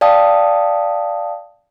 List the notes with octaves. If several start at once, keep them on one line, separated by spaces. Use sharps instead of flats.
D5 F5 G5 A5 D#6